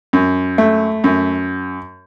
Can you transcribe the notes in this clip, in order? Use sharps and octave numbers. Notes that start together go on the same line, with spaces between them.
F#2
A3
F#2